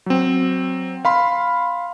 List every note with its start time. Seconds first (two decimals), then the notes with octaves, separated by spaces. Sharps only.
0.06 F#3 C4
1.05 F5 B5 C6